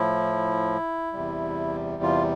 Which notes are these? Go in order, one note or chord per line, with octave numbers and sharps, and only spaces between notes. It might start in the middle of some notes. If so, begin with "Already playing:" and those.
Already playing: A2 F3 E4
E2 C3 G3
F4